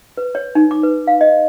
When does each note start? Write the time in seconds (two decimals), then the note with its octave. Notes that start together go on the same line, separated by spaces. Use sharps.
0.17 B4
0.35 C#5
0.55 D#4
0.71 D6
0.83 B4
1.07 F5
1.21 D#5